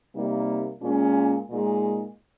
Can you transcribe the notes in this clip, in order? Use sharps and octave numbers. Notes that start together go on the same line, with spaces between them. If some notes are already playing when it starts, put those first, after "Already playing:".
C3 G3 A#3 D#4
A#2 G#3 C#4 F4
A#2 G#3 D#4